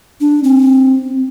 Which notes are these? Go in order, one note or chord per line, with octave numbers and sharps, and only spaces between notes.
D4
C4